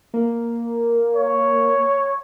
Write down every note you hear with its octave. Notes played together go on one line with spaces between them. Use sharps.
A#3
C#5